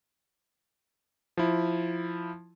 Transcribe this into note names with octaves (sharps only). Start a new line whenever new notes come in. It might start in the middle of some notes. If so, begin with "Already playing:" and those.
F3 E4